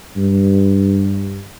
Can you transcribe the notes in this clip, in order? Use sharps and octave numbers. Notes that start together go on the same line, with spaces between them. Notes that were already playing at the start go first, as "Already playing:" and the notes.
G2